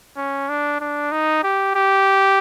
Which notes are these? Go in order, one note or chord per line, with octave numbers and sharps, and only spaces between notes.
C#4
D4
D4
D#4
G4
G4